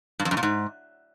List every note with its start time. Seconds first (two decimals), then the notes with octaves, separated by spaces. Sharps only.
0.19 G2
0.25 F2
0.31 F#2
0.37 A#2
0.43 G#2